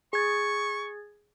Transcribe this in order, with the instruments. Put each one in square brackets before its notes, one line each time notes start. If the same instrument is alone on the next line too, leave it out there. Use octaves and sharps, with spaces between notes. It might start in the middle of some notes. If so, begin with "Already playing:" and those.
[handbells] G#4 G#6 A6 [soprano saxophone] C#6